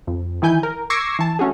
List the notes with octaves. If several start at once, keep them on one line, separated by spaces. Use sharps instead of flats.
F2
D#3 E3 E4 G#5 G6
A#4
C#6 D6 E6 G#6 A#6 C7
E3 A5
A3 C#4 F#4 G#4